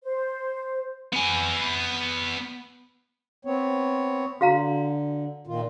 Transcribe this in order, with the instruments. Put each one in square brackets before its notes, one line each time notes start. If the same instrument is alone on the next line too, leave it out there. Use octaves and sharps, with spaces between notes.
[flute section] C5
[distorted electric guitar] B3 G#5
[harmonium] B3 C4 C#5
[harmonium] D3 [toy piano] F#4 F5 A#5
[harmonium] A#2 D#3 F4